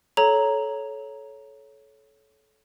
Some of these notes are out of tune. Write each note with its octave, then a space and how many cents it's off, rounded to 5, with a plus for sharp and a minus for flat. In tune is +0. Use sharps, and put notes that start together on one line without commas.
A4 -25 C#5 +0 A#5 +0